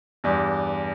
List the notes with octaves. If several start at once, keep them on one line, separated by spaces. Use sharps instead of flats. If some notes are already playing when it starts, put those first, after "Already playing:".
E2 G2